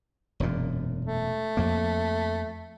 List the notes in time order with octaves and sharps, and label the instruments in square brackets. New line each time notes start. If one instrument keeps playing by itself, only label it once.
[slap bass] E1 F#2 A#2
[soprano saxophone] A3
[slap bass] F2 A#3